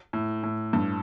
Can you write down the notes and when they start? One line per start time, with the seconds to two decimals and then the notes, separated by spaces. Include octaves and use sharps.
0.13 A2
0.43 A2
0.73 G2